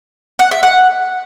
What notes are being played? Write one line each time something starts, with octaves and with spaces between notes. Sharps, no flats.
F#5
E5
F#5